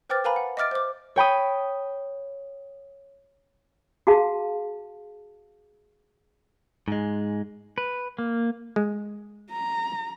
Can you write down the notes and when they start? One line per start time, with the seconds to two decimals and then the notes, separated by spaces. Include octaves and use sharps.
0.10 B4 C5 G5 D6 F6 A6
0.24 A#4 B4 F5 G#5 A#5 B5
0.36 F#5
0.57 D#5 E5 D6 F6 A6 D7
0.71 C5 D6
1.16 C#5 G5 B5 D#6
4.07 F#4 G#4 F5 A5
6.88 G#2 G#3
7.78 B4
8.19 A#3
8.76 G#3
9.50 A#5